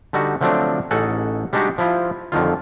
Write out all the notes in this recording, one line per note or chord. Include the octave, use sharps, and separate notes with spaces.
D3 G3 D#4 F#4
D3 F3 F#3 A3 C4 D4
A1 C#4 D#4 G#4 A4 F#5
G3 G#3 D4 D#4 F#4 G4
F3 E4 F4
F2 D3 D#3 F4